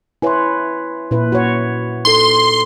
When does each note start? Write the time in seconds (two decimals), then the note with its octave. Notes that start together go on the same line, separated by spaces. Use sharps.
0.22 E4 B4 C#5 G#5 C6
1.11 A#2 E4 B4
1.32 F#4 C#5
2.05 D#4 A4 C6